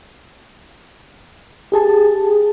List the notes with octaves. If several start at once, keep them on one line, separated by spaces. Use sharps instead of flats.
G4 G#4 A5